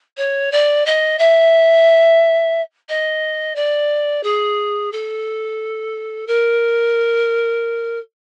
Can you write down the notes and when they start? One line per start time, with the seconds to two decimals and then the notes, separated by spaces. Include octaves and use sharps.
0.17 C#5
0.52 D5
0.86 D#5
1.19 E5
2.89 D#5
3.56 D5
4.23 G#4
4.92 A4
6.27 A#4